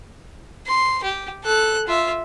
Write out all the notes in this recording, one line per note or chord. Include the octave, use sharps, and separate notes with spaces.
C6
G4
A4 F#6
F4 E5